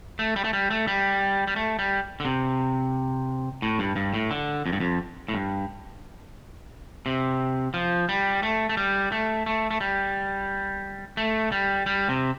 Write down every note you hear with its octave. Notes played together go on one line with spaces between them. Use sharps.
A3
G3
A3
G3
A3
G3
G3
A3
G3
D3
C3
A2
G2
G2
A2
D3
F2
G2
F2
A2
G2
C3
F3
G3
A3
A3
G3
A3
A3
A3
G3
A3
G3
G3
C3